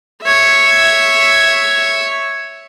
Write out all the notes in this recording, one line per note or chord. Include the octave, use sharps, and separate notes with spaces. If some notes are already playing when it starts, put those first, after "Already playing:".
C#5 E5